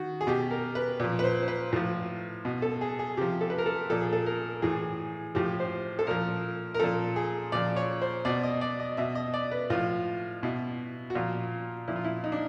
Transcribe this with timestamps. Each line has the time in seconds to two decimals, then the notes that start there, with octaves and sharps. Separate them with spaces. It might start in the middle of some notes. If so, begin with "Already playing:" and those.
Already playing: D#3 F#4
0.21 G#4
0.27 B2 G4
0.51 A#4
0.75 B4
1.00 A#2 F3
1.19 B4
1.24 C5
1.43 C5
1.48 B4
1.73 A2 F3
2.45 B2
2.62 A4
2.81 G#4
2.99 G#4
3.17 C3 F3 G4
3.41 A4
3.50 B4
3.58 A#4
3.66 A4
3.90 A#2 F3 A4
4.01 G#4
4.13 A4
4.26 A#4
4.62 A2 E3 G#4
5.35 A2 F3 G4
5.60 C5
5.99 A4
6.07 A#2 F3 A#4
6.74 A#4
6.79 A#2 F3 A4
7.16 G#4
7.52 A#2 F3 D5
7.76 C#5
8.02 C5
8.25 B2 D5
8.43 D#5
8.61 D5
8.80 D#5
8.97 B2 E5
9.15 D#5
9.34 D5
9.51 B4
9.70 A2 F3 F4
10.43 B2 E4
11.10 F#4
11.15 A#2 F3 F4
11.88 A#2 F3 E4
11.96 F4
12.04 E4
12.24 D#4
12.32 D4